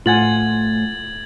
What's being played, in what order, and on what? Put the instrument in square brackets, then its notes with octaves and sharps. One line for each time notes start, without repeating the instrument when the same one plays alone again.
[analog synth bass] A2 [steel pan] F4 F#5 G#5 [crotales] G#6 A6 F#7